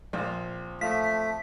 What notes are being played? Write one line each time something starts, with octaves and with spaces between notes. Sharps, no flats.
A#1 C4 F4 C5
F3 A3 B6